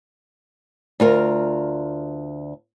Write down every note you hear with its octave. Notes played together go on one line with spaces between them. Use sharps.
D2 F4 A#4